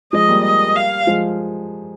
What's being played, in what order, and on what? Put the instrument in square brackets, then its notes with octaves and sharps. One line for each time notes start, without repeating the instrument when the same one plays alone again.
[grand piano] F3 G#3 [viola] D#5
[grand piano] G3 A#3
[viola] D#5
F5
[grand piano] F3 G#3